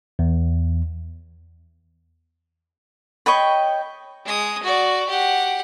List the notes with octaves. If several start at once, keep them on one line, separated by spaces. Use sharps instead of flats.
E2
C#5 D#5 G5 B5
G#3 D#6
F#4 D5
G4 F#5